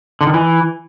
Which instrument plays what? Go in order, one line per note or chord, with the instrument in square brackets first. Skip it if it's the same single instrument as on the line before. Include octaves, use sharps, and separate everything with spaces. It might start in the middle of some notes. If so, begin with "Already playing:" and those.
[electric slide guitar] D3
D#3
E3